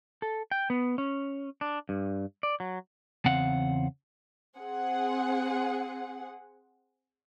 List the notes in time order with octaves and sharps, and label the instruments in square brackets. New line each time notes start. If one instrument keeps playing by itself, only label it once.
[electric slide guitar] A4
G5
B3
C#4
D4
G2
D5
F#3
[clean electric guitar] E2 C#3 C4 F5 F#5
[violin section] C4 G#4 F#5